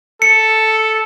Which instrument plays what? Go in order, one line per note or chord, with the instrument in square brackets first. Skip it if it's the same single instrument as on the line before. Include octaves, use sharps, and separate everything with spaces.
[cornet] A4 [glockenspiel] C#7